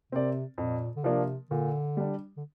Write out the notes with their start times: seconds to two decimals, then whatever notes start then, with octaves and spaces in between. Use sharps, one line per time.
0.12 C3 C4 A#4 D5
0.58 F2 A#2
0.96 D3
1.04 C3 F3 A#3 D4
1.51 A#2 D3
1.97 G3 D4
2.37 D3